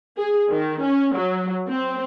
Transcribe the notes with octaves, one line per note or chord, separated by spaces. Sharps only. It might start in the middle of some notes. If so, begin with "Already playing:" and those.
G#4
D#3
C#4
F#3
C4